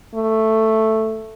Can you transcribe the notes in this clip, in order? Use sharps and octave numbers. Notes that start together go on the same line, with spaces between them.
A3